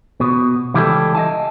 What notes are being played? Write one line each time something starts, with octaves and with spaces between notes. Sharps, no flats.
B2
C#2 E3 G3 E4 G4 A4
D#5 F5 G#5 A5